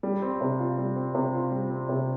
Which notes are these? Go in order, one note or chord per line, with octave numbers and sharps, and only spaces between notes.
G3
C4
C3
F4
G3
C4
C3
F4
G3
C4
C3